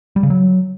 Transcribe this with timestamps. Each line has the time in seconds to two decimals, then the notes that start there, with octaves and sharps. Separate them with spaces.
0.16 G3
0.23 C#3
0.30 F#3